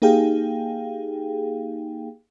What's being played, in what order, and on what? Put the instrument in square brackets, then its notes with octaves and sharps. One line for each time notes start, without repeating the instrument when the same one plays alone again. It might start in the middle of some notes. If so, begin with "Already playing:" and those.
[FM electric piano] A#3 D#4 G4 G#4 F5 G5